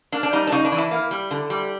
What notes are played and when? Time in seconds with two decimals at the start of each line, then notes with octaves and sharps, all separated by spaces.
0.12 A#3 D4
0.23 D4
0.33 G3 D#4
0.47 D4
0.52 C#3 D#4
0.65 D4
0.72 E3
0.78 E4
0.91 A#3
1.11 G3
1.31 D3
1.50 G3